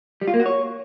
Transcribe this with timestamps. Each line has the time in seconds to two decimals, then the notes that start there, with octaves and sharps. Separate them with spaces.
0.21 G3
0.28 F4
0.34 A#3
0.40 F#4
0.46 C#5